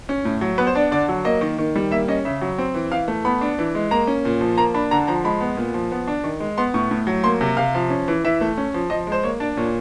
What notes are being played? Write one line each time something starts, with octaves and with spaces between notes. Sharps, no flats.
C#4
A2
F#3
B3 B4
C5
D4 D5
D3 D5
F#3
A#3 D#5
D#3
D#3
G3
A#3 E5
C#4 D#5
C#3 E5
F#3
C4
E3
E3 F5
A3
B3 B5
D4
E3
G#3
A#3 A#5
C#4
A#2
F3
A#3 A#5
D4 B5
D3 A#5
F3 A#5
G#3 B5
B3
A#2
F3
B3
D4
D#3
G#3
B3 C6
A2 C#6
A2
F#3
A#3 C6
C3
C3 F5
F3
C#4
E3
E3 E5
A3
C#4
F3
F3 D#5
G#3 C5
A#3 C#5
D4 D5
A#2 C#5